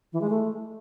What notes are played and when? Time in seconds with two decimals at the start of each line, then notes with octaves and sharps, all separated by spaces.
0.13 E3
0.21 G#3
0.30 A3